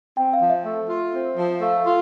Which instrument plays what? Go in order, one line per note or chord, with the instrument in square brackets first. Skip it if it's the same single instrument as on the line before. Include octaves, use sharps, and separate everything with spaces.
[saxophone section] C4 [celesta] G5
[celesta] F5
[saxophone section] F3
[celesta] E5
[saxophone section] A3
F4
C4
F3
[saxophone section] A3 [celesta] F5
[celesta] F5
[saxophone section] F4